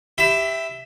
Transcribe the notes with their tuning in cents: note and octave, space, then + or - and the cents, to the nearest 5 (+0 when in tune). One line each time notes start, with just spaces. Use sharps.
G4 +0 E5 +0 B5 +30